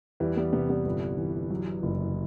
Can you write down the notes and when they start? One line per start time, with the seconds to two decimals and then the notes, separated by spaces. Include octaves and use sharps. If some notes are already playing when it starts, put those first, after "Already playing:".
0.20 E2 E3 G3
0.37 G3 B3
0.53 C3 G3 B3
0.69 G3 B3
0.85 G1
1.17 E3
1.50 F#3
1.83 F#1